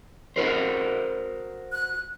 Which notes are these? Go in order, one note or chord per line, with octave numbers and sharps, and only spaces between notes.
F#4 A#4 C5
F#6